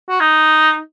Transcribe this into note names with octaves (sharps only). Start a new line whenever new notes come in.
F#4
D#4